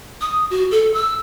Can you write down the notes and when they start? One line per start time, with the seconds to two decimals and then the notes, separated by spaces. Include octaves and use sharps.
0.21 D#6
0.50 F#4
0.71 A4
0.94 E6